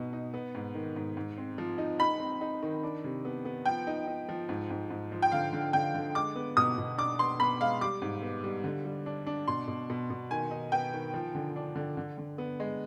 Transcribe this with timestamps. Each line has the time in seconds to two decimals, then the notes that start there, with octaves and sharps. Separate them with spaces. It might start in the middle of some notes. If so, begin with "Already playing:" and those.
Already playing: B2 B3 D#4
0.13 D#4
0.34 B3
0.55 G#2
0.75 D#3
0.96 G#2
1.17 G#2
1.38 C4
1.58 F3
1.78 D#4
1.99 D#4 B5
2.20 C4
2.41 D#4
2.62 D#3
2.83 D4
3.04 C3
3.25 B3
3.45 B3
3.65 F3 G5
3.87 D#4
4.07 D#4
4.29 F3
4.49 G#2
4.70 G#2
4.90 G#2
5.12 F3
5.22 G5
5.32 D3 F5
5.53 D3
5.73 D3 G5
5.95 D3
6.15 G#3 D6
6.36 B3
6.57 B2 D#6
6.78 B2
6.98 D4 D6
7.19 B3 C6
7.40 B3 B5
7.61 G#3 F5
7.81 G3 D6
8.02 G#2
8.22 B3
8.44 G3
8.64 D3
8.85 G3
9.06 D4
9.27 D4
9.48 B2 C6
9.68 B2
9.90 B2
10.10 B2
10.31 D#3 G#5
10.51 D#4
10.72 B3 G5
10.94 D#3
11.14 F3
11.35 D3
11.56 D4
11.76 D3
11.97 D3
12.18 D3
12.38 B3
12.60 G#3